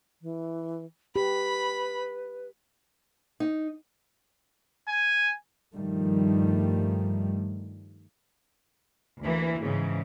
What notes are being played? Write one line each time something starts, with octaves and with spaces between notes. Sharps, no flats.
E3
G4 B4 B5
D#4
G#5
G2 D#3 F3 G3 A3
D2 E3 A#3
G#2 C#3 E3